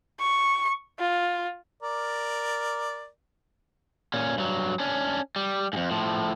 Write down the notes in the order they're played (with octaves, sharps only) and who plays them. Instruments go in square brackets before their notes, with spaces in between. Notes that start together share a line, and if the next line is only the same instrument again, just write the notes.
[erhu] C#6
F4
[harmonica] A#4 D5
[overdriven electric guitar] A#2 C#4
G2 F#3
C#4 D4
G3
F2 G#2
A2 F3